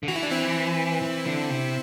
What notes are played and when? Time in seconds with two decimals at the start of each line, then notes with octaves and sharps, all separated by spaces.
0.03 D3
0.08 E3 F#4
0.16 E4
0.23 D4
0.31 C4 E4
1.02 E3
1.26 D3
1.50 C3